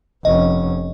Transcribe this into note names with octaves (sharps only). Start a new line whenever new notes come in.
F1 C#4 D#5